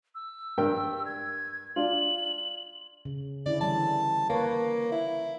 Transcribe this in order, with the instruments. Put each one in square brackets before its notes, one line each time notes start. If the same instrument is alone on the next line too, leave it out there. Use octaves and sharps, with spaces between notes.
[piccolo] E6
[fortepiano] G2 A#4 G5
[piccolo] G#6
[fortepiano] D4 F4 [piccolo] F#7
[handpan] C#3
[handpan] D3 C#4 E4 [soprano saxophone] D5
[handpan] E3 G3 [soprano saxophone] A5
[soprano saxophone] A#3 [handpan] B4 C#5
[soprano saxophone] E4